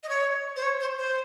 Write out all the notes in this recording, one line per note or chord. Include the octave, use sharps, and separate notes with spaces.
D#5
C#5
C5
C#5
C5
C5